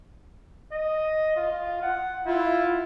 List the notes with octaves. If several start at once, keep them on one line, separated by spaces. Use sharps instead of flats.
D#5
F4
F#5
E4 F4